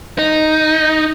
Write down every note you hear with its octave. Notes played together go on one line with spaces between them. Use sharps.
D#4